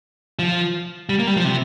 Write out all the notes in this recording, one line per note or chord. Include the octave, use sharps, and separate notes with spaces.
F3
G3
A#3
G3
F3
C3